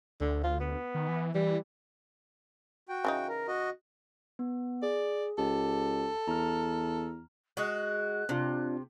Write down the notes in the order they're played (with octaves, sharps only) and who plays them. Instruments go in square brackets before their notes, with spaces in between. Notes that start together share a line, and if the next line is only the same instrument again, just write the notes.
[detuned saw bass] D2 [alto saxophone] D3
[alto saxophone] F4
B3
[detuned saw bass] D#3
E3
[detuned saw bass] E3 [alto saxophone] G3
[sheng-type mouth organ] F#4 G5
[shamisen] C#3 E3 D#4
[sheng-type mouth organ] A#4
F#4 D#5
[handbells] B3
[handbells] G#4 [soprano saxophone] D5
[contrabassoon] C#2 [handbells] G4 [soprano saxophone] A4
[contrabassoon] E2 [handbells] A#5 F6
[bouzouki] G#3 F#4 [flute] F#6
[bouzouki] C3 [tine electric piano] C4 D4 F4